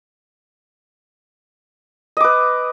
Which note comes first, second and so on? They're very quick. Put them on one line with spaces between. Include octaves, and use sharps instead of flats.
D#5 D6 B4